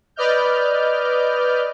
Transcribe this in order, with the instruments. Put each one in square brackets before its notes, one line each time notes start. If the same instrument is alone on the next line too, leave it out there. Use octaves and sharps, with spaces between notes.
[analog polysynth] B4 D5 D#5 F6 G6